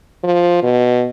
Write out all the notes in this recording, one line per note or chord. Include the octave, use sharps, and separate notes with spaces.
F3
B2